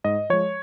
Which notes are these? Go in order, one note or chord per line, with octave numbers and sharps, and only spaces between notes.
G#2 D#5
F3 G#3 C#5